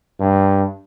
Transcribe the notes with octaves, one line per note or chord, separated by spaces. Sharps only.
G2